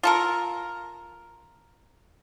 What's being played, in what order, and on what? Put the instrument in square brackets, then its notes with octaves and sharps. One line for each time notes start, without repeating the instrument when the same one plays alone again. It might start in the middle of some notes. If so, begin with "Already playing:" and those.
[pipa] F4 A4 A#4